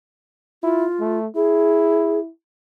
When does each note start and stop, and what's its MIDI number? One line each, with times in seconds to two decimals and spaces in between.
0.63 0.86 64
0.63 1.19 65
1.00 1.27 57
1.36 2.29 64
1.36 2.19 68